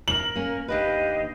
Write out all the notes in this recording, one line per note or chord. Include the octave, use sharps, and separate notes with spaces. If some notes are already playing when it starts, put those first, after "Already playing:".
A#4 F#7
A#3 C#4
D#2 D4 G4 B4 D#5 F5